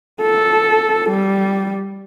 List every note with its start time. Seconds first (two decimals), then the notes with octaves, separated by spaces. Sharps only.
0.22 A4
1.10 G3